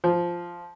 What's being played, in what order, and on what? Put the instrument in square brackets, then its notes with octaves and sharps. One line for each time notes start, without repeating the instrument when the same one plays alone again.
[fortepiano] F3